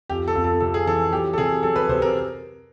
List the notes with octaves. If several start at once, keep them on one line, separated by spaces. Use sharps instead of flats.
F2 G4
A4
F2
A4
C3 A4
G#4
E3 A4
F#3 G4
A4
C3 G#4
F#3 A4
B4
C3 C5
A#4